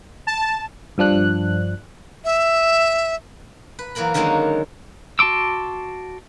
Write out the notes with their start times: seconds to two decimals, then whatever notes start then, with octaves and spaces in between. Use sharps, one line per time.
0.27 A5
0.98 G2 F3 D4 F#6
2.25 E5
3.79 B4
3.95 E3 F#3 A#3 A#4 B5
4.14 D3 D#3 F#3 G#3 A#3 C#4
5.19 F#4 A5 C6 D6 E6